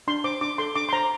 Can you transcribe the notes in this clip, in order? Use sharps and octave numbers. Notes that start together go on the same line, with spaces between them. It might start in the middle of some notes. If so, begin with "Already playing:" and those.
D4 C6
C5 D6
D4 D6
A4 C6
D4 D6
C6
C5 A#5